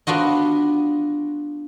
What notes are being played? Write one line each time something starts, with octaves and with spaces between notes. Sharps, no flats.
B3 D4 F4 F#4 D#5